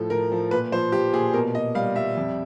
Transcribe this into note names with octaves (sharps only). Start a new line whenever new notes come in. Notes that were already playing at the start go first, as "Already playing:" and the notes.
Already playing: A2 F3 A4
A2 A#4
F3
A#2 B4
F3 C5
F3 G4
A#2 G#4
B2 A#4
B2 D#5
G3 F5
G3 E5
F2